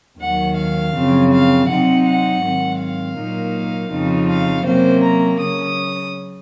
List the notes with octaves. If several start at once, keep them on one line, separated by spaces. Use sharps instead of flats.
D#2 D#3 F#3 F#5
F5
F#2 C#3 F3 C4
F5
C3 F#3 C4 D#4 F#5
F#5
G#2 D#3 F#3 C4
F5
A#2 F#3 A#3 D#4
F2 C#3 F3 C4 D#4
F5
C3 F#3 A#3 C#4 C5
A#5
C#3 F#3 C#4 D#6